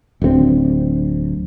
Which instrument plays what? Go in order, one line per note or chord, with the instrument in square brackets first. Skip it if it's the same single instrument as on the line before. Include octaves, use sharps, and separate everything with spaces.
[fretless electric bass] D1 D2 G#3 C4